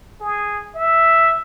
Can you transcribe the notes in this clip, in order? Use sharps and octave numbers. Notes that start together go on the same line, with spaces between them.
G#4
E5